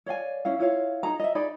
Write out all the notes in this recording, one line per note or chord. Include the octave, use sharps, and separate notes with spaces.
C#5 D5 F5 G#5
C#4 E4 F5
E4 F4 C#5 F5
D#4 G#4 A#5
D#5 E5
D#4 G#4 D5 B5